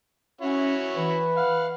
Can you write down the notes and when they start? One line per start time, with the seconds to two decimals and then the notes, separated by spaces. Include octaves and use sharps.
0.41 C#4 E4 F#4 C#5
0.97 E3 B4
1.37 F5 F#5